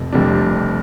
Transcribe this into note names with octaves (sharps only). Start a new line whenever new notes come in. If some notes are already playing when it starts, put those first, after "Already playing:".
Already playing: F1 F2 C3
F1 F2 C3 G3 D4